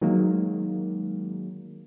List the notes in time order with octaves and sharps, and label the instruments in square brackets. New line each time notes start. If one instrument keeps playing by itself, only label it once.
[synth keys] D#3 F#3 G#3 A#3